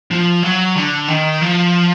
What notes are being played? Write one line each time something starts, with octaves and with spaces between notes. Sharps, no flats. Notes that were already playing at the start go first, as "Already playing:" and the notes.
F3
F#3
D3
D#3
F3